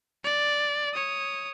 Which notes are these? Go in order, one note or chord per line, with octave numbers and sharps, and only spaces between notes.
D5
C#5 D#6